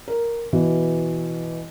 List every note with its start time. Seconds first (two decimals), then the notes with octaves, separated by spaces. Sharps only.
0.08 A#4
0.53 B2 E3